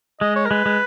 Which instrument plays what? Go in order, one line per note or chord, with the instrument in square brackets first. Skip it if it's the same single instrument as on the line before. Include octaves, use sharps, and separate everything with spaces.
[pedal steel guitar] G#3 [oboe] D#5
[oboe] C#5
A#4
[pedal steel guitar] G#3 [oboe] B4
[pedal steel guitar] G#3